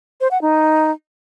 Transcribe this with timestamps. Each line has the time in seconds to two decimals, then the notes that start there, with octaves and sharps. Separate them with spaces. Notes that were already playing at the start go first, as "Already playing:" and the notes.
0.21 C5
0.31 F#5
0.41 D#4